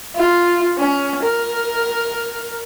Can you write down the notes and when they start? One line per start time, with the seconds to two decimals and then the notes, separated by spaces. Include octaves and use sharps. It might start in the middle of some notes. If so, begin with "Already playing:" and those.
0.16 F4
0.78 C#4
1.23 A#4